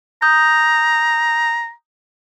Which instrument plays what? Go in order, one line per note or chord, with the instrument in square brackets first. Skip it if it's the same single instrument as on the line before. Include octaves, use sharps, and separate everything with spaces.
[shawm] A#5 [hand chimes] D#6 G6